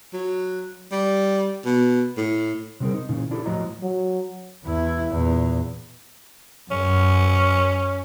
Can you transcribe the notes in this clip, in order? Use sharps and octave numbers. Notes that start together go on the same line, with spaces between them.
F#3
G3
B2
A2
C3 F#3 G3 C4 G#4 A#4
D#4
A#2 C#3 E3
D4 E4 G4 A4
A2 F3 F#3 D#5 A#5
F#3
E2 E4
E2 A#2
F#2 C#4